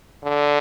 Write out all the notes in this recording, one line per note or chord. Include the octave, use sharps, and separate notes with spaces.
D3